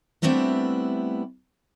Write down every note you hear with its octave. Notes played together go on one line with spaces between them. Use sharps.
G3 A3 B3 C4 D4 E4